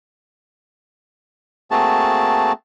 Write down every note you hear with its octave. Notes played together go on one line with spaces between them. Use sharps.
A3 A#3 C4 F#4 G#4 A5